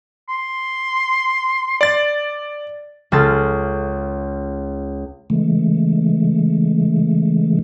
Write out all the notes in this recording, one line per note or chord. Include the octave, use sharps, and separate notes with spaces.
C6
D5 A6
C#2 C#4 F4 A4 A6
C#3 E3 G#3 A3